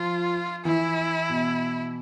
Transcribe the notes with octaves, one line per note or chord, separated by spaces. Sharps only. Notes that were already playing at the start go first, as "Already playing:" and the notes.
Already playing: F3 F4
E3 E4
B2